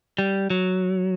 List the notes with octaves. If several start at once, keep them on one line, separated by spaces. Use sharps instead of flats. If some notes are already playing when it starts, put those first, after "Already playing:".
G3
F#3